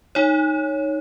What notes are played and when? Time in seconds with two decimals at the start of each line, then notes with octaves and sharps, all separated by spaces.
0.15 D#4 C#5